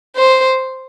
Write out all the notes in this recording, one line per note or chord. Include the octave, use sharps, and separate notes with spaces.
C5